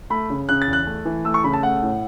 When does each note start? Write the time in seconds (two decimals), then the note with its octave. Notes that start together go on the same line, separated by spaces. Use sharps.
0.10 A3 B5
0.30 C#3
0.49 C#3 F#6
0.62 A6
0.68 E2
0.73 F#6
0.87 A3
1.05 E3
1.25 A3 E6
1.34 C#6
1.44 C#3 B5
1.54 A5
1.62 A3 F#5
1.83 A2